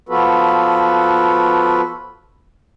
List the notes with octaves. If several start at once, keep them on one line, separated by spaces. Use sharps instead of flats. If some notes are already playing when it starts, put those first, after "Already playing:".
F3 B3 F4 F#4 A4 B4